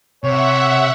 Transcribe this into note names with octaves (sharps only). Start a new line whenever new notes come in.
C3 C#5 E5 F#5